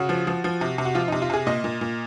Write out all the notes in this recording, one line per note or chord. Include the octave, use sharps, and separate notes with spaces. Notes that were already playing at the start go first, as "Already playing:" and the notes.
Already playing: C#3 F#4
F3
F3
F3
C3
C3
F#4
F3 F4
C3 D#4
F4
C3 G#4
A#2 D#5
A#2
A#2